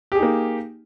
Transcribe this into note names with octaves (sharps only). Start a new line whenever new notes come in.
A#3 D#4 G4 G#4